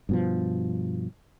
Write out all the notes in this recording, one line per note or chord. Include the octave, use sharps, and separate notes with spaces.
G2 B2 F3